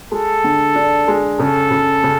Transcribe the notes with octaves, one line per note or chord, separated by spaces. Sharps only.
G#3 A4
D3
D4
G#3
C#3 A4
C#3
C#3